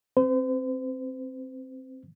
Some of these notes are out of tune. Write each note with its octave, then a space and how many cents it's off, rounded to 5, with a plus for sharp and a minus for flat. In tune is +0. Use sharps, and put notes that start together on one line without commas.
C4 +10 C5 -40